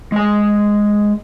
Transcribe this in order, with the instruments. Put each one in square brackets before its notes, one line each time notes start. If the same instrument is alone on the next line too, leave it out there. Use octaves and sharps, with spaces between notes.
[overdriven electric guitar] G#3 G#5